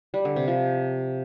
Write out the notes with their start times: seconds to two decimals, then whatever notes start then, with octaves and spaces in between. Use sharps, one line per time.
0.14 G3
0.25 D3
0.36 C3
0.48 F3